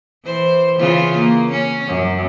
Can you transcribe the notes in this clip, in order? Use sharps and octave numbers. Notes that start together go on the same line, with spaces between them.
E3 C5
C#3 E3 F4
A#3
C#4
F#2